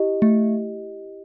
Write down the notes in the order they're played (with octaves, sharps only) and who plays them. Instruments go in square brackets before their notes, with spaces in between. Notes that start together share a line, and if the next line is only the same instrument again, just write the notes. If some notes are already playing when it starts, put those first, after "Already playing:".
Already playing: [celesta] E4 G4 D#5
[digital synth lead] A3